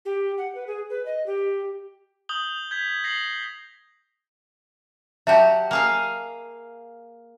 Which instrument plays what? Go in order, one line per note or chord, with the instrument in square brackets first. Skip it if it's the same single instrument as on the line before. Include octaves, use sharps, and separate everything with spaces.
[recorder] G4
F#5
B4
G#4
B4
D#5
G4
[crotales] D#6 G6 F#7 G7
G6 G#6 B6
A#6 C7 F#7 G7
[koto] F#3 F#4 G4 [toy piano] E5 A5
[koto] A#3 G#4 F5